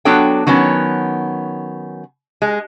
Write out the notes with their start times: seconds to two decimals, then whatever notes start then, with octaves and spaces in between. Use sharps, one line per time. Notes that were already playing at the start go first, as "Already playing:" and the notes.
0.05 F#3 B3 D4 A4 C#5 G5
0.47 D#3 F#3 B3 C#4
2.42 G#3